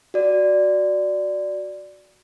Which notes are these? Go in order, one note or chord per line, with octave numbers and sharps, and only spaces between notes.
F#4 D5